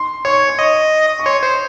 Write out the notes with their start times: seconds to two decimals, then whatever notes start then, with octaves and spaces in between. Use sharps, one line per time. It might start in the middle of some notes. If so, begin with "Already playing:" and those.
Already playing: C6
0.25 C#5 C#6
0.59 D#5 C#6
1.19 C#6
1.26 C#5 C6
1.43 C5